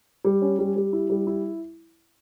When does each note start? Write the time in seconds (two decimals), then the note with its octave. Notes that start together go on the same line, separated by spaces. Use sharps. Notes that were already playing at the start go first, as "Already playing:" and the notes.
0.25 G3
0.42 C#4
0.59 G3
0.76 G3
0.93 E4
1.10 G3
1.27 E4